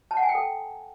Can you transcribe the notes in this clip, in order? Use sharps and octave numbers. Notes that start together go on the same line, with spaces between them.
A5
F#5
G#5
G5
A4